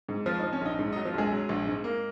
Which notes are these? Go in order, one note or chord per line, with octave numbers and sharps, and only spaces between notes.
G#2
F3 F4
F3 D#4
C#4
A#1 D#4
G#2
F#3 D#4
F3 F4
A#1 G#3 G#4
F#3
A#1
G#2
A#3